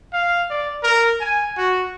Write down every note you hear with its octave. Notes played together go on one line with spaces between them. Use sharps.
F5
D5
A#4
G#5
F#4